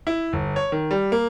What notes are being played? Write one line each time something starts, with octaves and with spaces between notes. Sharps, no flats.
E4
G1
C#5
D#3
G3
A#3